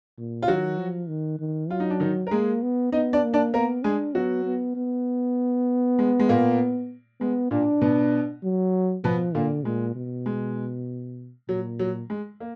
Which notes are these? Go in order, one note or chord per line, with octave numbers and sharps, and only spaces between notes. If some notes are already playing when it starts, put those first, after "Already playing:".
A#2
F4
D#3 F#3 F#4
F3
D#3
D#3
F#3 F4
D#4
D4
D#3 D#4
A#4
G#3 A#3 G#4
B3
B3 D#4 D#5
D4 D5
A#3
D4 D5
A#3 B3 A#4
G#3 D4 G#4
F#3 B3 F#4
B3
B3
G#3
G#3
A#2 A#3
G#3 B3
A#2 A#3 D4
B2 B3
F#3
B2 F3 B3
A#2 D3 A#3
A#2 G#3
B2
G#3
A#2 F#3
F#3
G#3
A#3